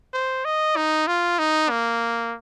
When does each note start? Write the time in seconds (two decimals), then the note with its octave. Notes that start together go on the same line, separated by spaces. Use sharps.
0.14 C5
0.45 D#5
0.76 D#4
1.07 F4
1.39 D#4
1.70 A#3